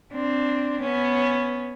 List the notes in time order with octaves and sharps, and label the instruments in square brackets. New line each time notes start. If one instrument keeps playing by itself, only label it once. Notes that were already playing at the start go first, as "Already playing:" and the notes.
[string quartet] C4 D4
B3 C#4